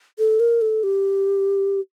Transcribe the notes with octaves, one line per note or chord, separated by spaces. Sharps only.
A4
A#4
A4
G4